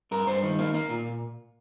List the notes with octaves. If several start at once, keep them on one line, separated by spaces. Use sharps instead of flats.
G2 A#4
G2 C5
D#3
A#3
A#3
A#2